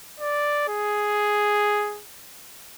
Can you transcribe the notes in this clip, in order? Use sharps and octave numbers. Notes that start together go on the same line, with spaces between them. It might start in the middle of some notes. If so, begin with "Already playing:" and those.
D5
G#4